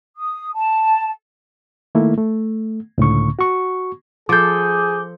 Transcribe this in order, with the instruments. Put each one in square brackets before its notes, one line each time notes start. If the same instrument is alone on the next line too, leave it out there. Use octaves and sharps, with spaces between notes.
[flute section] D#6
A5
[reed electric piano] D#3 A3 A#3 E4
A3
C#2 A2 D3 C#6
F#4 C#6
[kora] F3 A4 [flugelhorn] G#4 [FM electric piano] D6 G6